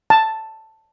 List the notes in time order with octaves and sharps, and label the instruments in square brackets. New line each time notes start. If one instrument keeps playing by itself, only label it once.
[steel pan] A5